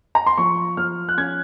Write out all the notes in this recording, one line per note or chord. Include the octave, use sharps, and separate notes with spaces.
A#5
C6
F3 C#6
F3 F6
F#6
C#4 G#6